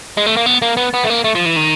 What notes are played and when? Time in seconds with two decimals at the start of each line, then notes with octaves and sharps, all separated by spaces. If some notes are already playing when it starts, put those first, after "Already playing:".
0.17 G#3
0.26 A3
0.37 A#3
0.46 B3
0.62 A#3
0.77 B3
0.94 B3
1.04 A3
1.10 A#3
1.24 A3
1.35 F3
1.46 E3
1.56 D#3